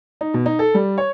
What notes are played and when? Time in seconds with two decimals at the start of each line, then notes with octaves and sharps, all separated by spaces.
0.21 D#4
0.34 B2
0.46 D#4
0.59 A4
0.74 G3
0.98 C#5